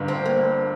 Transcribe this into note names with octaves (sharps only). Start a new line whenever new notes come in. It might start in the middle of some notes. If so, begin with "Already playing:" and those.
Already playing: G1 G2 D3
C4
A#3